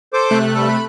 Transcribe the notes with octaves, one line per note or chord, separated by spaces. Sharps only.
A4 C5 D6
C3 A3 F#6
G2 G3 A4
B5